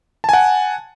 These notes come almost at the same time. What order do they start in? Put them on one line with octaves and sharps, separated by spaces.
A5 G#5 F#5